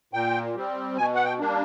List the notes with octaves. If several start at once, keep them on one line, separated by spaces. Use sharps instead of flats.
A#2 G5
G3 C4
B2 G#5
F#5
G5
G3 A#3 D4